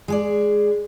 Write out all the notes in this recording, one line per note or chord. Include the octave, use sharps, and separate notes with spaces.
G#3 G#4 D5